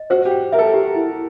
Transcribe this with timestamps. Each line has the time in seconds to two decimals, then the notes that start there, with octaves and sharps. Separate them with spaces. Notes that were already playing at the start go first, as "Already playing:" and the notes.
Already playing: D#5
0.10 F#4 C5
0.25 G4
0.31 G5
0.52 A#4 E5
0.59 A4
0.74 G4
0.95 E4